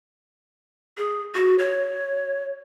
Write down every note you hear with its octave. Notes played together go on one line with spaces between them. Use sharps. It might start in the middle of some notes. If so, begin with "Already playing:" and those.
G#4
F#4
C#5